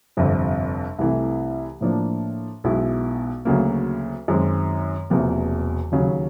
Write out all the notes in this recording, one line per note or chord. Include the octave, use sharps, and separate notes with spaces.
G1 F2 C3
C2 C3 E3 A3
A2 F3 A#3 D4
B1 B2 G#3 B3 E4
D2 C#3 F#3 A#3
F#2 D#3 G#3 C4
E1 E2 C3 F3 A#3
D#2 C#3 F#3